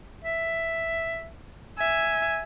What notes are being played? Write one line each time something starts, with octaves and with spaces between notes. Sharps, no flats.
E5
E5 G#5